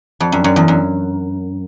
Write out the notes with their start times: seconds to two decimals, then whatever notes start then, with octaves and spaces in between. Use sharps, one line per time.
0.20 F2
0.32 F#2
0.44 F#2
0.56 E2
0.68 F#2